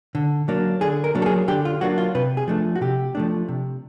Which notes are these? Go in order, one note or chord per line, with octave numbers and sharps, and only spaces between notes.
D3
F#3 A#3 D4
D3 G#4
A#4
F#3 A#3 D4
A4
G#4
D3 G4
F4
F#3 A#3 D4 F#4
F4
C3 B4
G#4
F3 A3 D4
F#4
C3 G4
F3 A3 D4
C3